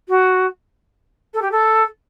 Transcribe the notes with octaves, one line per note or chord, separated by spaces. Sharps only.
F#4
A4
G4
A4